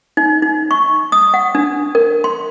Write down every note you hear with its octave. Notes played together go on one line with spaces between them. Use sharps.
D#4
D#4
C#6
D#6
F#5
D4
A#4
C6